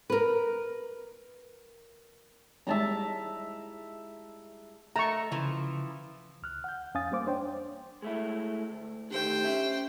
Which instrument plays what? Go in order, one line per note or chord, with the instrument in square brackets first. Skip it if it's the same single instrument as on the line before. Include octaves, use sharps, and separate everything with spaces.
[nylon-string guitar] A#4 B4
[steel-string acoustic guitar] G3 G#3 E4 [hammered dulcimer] E5 A5 A#5
[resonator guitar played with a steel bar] A3 [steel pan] A#5 C#6
[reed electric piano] C#3 [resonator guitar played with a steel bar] E3 F3
[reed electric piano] C#2 F6 F#6
F#5 G6
F2 C#4 F5 G#5 D#6 A6
G3 A#3 C5 D6
D4 C5 C#5 G5
[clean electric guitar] G#3 A3 E4
D2
[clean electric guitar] D3 D#3 A3 [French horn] G4 [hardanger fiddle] C5 G5
[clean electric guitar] C#4 E5